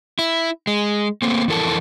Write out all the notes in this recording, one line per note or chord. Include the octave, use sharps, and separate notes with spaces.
E4
G#3
A3 A#3 C4
F2 E3 E4 A4 A#4 A5